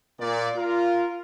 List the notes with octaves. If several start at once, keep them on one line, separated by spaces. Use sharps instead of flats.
A#2 D5
F4 A#4